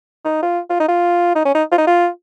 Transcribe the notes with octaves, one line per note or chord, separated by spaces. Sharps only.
D#4
F4
F4
D#4
F4
D#4
C#4
D#4
F4
D#4
F4